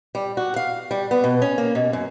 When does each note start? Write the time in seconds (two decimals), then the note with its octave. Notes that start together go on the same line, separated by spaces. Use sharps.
0.15 G3
0.37 F#4
0.56 F5
0.91 G3
1.11 B3
1.24 B2
1.42 C#4
1.58 A#3
1.75 B2
1.93 F#2